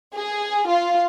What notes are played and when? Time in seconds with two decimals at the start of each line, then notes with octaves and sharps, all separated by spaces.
0.15 G#4
0.68 F4